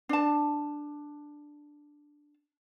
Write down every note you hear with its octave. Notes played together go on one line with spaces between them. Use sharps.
D4 A5